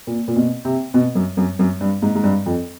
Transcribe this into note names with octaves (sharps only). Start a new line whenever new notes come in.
A#2
A#2
B2
C3
B2
F#2
F#2
F#2
G2
G#2
G#2
G2
F2